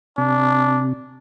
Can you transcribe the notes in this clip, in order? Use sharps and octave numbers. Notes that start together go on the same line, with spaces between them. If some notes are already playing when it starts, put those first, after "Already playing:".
C3 D4